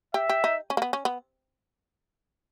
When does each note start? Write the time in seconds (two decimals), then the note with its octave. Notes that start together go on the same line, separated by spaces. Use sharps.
0.14 G4 E5
0.29 G4
0.44 D#4
0.70 C#4
0.77 A#3
0.82 B3
0.93 C#4
1.05 B3